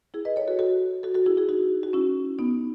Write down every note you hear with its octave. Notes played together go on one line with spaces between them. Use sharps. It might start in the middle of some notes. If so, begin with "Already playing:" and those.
E4 G#4
B4 D#5
A4 C#5
F#4 A4
F#4 A4
F#4 A4
F#4 A4
E4 G#4
E4 G#4
D#4 F#4
F#4
C#4 E4
B3 D#4